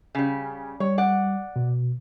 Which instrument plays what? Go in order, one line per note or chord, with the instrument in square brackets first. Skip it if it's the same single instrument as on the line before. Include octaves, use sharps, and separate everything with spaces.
[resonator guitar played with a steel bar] C#3 G3
[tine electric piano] G3 [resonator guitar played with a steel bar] C#5
[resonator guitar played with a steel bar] D5 F#5
[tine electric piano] B2